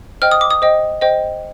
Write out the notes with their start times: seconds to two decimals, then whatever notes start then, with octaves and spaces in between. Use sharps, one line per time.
0.22 C5 D#5 G5 F6
0.31 D#6
0.41 D6
0.51 D#6
0.62 C5 D#5 G5
1.01 C5 D#5 G5